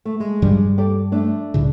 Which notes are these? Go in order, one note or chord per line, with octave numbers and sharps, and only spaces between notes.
A3
G#3
G2 F3 G3
G4 A4 D5
A3 D4
C#2 A2 C#3